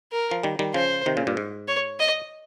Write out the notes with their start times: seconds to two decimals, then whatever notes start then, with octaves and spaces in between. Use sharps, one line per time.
0.12 A#4
0.31 F3
0.43 D#3 G3
0.59 D#3 G3
0.74 C#3 F3 C5
1.06 C3 D#3
1.17 A#2 C#3
1.27 G2 A#2
1.37 G#2
1.68 C#5
2.00 D#5